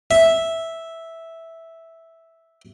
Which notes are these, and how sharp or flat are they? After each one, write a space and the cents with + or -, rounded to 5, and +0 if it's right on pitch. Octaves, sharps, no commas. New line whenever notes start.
E5 -5